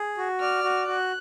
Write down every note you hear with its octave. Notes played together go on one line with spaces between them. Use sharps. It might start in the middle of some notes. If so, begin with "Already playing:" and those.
Already playing: G#4
F#4
D5 F6
F#4
F#4 F#6